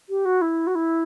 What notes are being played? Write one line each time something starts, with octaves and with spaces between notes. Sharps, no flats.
G4
F#4
E4
F#4
E4